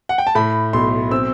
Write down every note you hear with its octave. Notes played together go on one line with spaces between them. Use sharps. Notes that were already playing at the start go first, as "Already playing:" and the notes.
F#5
G5
A5
A2 B5
B1 C6
C4 E6